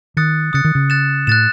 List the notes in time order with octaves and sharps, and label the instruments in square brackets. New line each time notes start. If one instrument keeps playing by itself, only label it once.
[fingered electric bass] D#3 [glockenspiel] D#6 F#6 A6 C#7
[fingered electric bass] C#3 [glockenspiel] D#6 F#6 A6 C#7
[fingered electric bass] D#3
C#3
[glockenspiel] F#6 A6 E7
[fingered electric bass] A2 [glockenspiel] F#6 A6 E7